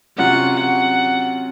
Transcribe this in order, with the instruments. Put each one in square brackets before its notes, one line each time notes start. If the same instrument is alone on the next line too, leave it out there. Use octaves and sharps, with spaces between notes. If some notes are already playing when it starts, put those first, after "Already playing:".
[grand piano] C3 F#3 C#4 F4 [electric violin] F#5
[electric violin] F#5